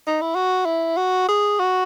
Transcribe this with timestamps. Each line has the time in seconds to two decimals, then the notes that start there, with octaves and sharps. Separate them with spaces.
0.07 D#4
0.21 E4
0.35 F#4
0.65 E4
0.97 F#4
1.28 G#4
1.59 F#4